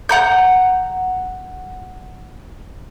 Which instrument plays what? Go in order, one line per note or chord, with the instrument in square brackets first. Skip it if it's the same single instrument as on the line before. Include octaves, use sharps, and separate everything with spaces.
[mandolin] F#5 A#5 G6